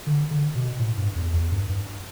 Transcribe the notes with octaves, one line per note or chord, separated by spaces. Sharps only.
D3
D3
B2
A2
G2
E2
E2
G2
G2